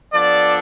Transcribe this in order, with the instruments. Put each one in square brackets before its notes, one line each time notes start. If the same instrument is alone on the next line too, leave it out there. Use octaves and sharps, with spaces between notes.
[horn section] F3 B3 D4 A4 [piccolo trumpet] D5